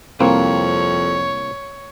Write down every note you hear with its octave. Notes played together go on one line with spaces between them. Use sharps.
C2 F2 A#3 C4 C#5